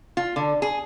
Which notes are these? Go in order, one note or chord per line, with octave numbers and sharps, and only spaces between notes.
F4
D3
G#4